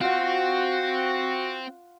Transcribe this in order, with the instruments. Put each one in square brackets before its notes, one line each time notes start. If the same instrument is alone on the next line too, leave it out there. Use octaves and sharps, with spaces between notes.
[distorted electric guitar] C4 [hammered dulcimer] F4 F#5 [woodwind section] F#4